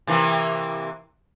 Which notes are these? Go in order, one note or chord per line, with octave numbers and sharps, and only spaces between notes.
C3 E3 A#3